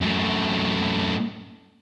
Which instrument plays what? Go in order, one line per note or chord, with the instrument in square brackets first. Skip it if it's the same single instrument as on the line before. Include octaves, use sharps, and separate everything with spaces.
[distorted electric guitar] F#2 A2